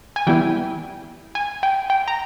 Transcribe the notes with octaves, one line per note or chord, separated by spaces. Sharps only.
G#5
E3 G3 B3 E4 G5
G#5
G5
G5
A#5